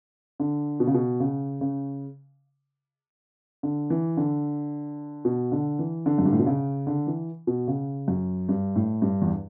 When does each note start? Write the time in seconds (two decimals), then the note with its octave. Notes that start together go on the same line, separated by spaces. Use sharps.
0.40 D3
0.80 B2
0.87 C#3
0.94 B2
1.20 C#3
1.61 C#3
3.63 D3
3.90 E3
4.17 D3
5.25 B2
5.52 D3
5.79 E3
6.06 D3
6.18 F#2
6.25 G2
6.32 A2
6.39 B2
6.46 C#3
6.87 D3
7.07 E3
7.47 B2
7.68 C#3
8.08 F#2
8.49 G2
8.76 A2
9.02 G2
9.22 E2